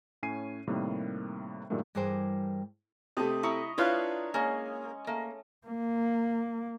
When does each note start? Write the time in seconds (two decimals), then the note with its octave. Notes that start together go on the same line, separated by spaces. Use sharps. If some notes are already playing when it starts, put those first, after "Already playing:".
0.23 A2 C#4 G#5 C7 D#7
0.67 A2 C3 D#3 G3 A#3
1.70 G2 A#2 D#3 F#3 G#3 A3
1.95 G2 E3 G3 G#4 A#4 C5
3.17 C3 A3 D#5 A5 D#6
3.43 E4 D#5 A#5 C#6
3.78 D4 E4 F4 B4 C#5 F5
4.34 G#3 A#3 C#4 G#5
5.07 A3 A#3
5.67 A#3